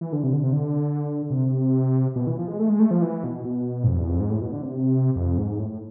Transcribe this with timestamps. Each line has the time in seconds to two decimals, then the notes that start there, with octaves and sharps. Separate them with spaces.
0.01 E3
0.12 D3
0.23 C3
0.33 D3
0.44 C3
0.53 D3
1.30 C3
2.16 B2
2.27 E3
2.37 F3
2.48 G#3
2.59 A3
2.69 G#3
2.80 A3
2.91 F3
3.02 E3
3.24 B2
3.45 B2
3.84 G#2
3.88 F2
3.98 E2
4.09 F2
4.20 G#2
4.30 A2
4.41 B2
4.52 D3
4.62 C3
5.16 F2
5.38 G#2
5.59 A2